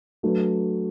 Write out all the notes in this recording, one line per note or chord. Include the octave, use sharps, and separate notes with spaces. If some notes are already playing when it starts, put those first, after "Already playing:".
F#3 A3 D4 F#4 B4